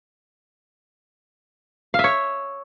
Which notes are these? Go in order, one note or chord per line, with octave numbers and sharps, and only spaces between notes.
F5
E5
C#5